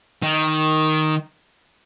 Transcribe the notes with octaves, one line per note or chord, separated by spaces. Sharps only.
D#3